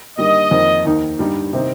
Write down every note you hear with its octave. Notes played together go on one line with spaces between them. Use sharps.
G2 D#3 G3 A#3 D#5
F2 D#3 A#3
D#2 D#3 A#3 D#4
G2 G3 D#4
C3 D#3 C4 D#4